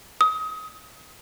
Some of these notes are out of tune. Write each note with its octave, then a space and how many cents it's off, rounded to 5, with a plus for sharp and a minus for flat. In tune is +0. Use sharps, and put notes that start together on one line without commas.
D#6 +25